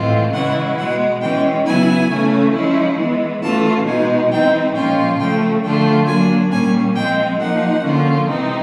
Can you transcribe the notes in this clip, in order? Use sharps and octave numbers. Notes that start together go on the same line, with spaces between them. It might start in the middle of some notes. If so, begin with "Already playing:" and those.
Already playing: A2 E3 G#3 C4 F4
C#3 E3 G#3 C#4 E4 F#5
B2 G#3 B3 F#5
E3 G#3 C#4 G5
C#3 F#3 B3 E4 G#5
C#3 E3 A3 C#4
F3 G#3 C#4 E4
E3 G#3 B3
E3 A3 C#4 F4 A5
B2 G#3 B3 D#4 G#5
E3 G#3 C4 D#4 G5
A#2 F3 G#3 C#4 F4 G5
C#3 F3 A3 G5
D3 F3 A3 D4 F4 G5
F#3 A#3 D4 G#5
A#2 G3 A#3 C#4 G#5
F3 G#3 C4 G5
F3 A#3 D#4 F#5
D3 F3 A#3 C#4 F4
C3 E3 G#3 C4 D#4